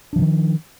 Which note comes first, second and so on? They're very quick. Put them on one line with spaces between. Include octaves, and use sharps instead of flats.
D4 F3 D3 D#3